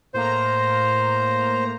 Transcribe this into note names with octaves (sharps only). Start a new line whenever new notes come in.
A2 A#3 C5 A#5